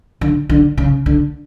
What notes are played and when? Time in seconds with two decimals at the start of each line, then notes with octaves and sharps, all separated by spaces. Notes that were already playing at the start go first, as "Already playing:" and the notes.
0.21 D3
0.49 D3
0.77 C#3
1.06 D3